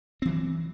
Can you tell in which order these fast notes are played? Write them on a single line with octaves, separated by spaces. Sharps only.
C4 E3 F#3